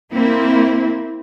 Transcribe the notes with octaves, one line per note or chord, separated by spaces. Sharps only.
A#3 C4 E4